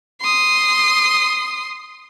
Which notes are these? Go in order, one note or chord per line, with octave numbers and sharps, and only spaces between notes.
C6 D#6